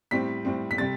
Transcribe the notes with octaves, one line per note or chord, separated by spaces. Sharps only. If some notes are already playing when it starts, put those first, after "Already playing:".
A2 G3 C4 B6
A2 G3 C4
B6
C3 G3 C4 A6